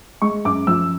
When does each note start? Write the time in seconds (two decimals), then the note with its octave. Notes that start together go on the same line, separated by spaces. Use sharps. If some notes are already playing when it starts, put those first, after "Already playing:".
0.22 G#3 C#6
0.45 F#2 D6
0.67 F3 E6